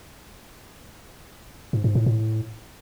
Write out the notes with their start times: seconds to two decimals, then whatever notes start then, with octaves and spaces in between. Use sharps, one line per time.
1.73 G#2
1.84 G#2
1.95 A2
2.06 A2